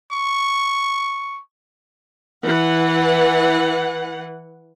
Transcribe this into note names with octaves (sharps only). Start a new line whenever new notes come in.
C#6
E3 F#5